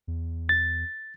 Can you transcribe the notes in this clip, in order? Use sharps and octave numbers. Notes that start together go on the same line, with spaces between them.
E2
A6